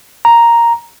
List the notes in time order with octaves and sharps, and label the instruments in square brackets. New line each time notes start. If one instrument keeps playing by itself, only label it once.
[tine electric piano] A#5